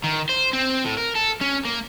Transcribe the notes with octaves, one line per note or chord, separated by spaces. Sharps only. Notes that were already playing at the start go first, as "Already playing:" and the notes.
D#3
C5
C4
A2
A#4
A4
C#4
A#3